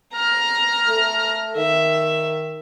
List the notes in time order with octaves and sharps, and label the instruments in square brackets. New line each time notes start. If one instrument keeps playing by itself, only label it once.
[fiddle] A#5 F6
[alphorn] A3
[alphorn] D#3 [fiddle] E5